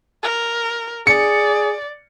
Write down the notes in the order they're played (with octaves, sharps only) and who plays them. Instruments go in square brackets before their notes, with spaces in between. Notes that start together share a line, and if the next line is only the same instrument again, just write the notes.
[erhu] A#4
[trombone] G#4 [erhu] D5 [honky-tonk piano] C#7